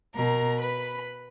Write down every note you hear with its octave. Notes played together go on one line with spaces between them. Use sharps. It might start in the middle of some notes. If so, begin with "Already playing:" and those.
B2 A#4 A#5
B4 B5